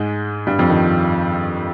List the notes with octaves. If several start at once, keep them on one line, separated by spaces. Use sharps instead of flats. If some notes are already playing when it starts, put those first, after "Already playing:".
Already playing: G#2 G#3
G2 G3
F2 F3
D#3